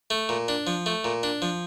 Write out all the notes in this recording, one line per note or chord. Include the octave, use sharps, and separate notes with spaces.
A3
A#2
D4
F3
A3
A#2
D4
F3